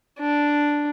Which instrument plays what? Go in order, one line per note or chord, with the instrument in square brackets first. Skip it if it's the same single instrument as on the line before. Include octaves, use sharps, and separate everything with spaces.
[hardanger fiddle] D4